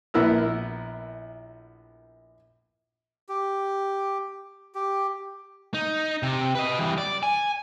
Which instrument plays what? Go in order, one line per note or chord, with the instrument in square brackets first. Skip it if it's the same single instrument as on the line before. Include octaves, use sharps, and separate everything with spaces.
[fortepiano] A#1 B3 E4 A#4 E6
[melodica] G4
G4
[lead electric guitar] D#4
C3
B4 D#5
E3 G3
D5
G#5